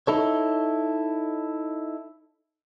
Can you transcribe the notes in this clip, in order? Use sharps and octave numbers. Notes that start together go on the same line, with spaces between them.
D#4 E4 A4 C#5